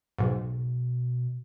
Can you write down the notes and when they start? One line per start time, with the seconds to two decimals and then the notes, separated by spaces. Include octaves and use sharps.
0.18 B1 G#2 B2
0.31 B2